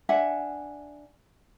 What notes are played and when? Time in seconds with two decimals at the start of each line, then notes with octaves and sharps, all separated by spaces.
0.09 D4 E5 F#5 G#5